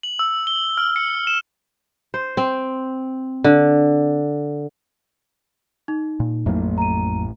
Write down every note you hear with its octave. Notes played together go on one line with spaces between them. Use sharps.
F#7
E6
G7
F6
C#7
E7
C5
C4
D3
D#4
A#2
A1 F2 A2 F#3 A3 A#3
A#5 D#7